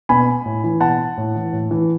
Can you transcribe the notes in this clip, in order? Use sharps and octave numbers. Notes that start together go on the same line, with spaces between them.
B2 G#5 B5
A2
E3
B2 F#5 A5
A2
E3
A2
E3